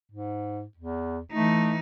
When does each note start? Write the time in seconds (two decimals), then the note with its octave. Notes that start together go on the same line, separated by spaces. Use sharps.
0.12 G#2
0.77 E2
1.33 E3 A3 D#4